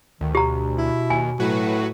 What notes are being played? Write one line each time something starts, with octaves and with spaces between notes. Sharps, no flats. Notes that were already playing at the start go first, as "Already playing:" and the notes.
D2 D#3
B2 G4 A#5
E4
D#2 G#5
A2 F#3 F#4 B4